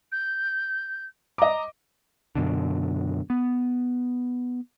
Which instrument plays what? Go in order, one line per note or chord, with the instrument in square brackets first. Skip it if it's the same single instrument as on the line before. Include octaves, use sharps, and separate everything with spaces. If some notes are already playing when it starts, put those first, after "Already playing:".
[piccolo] G6
[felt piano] D#5 D6 [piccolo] A#5
[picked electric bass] F#2 B2 D3
B3